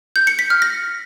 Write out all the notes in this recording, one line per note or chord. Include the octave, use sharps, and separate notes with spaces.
G6
C#7
B6
F6
A#6